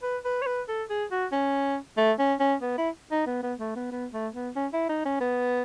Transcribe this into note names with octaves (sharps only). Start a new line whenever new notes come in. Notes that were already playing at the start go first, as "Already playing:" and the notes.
B4
B4
C#5
B4
A4
G#4
F#4
C#4
A3
C#4
C#4
B3
E4
D#4
B3
B3
A3
B3
B3
A3
B3
C#4
E4
D#4
C#4
B3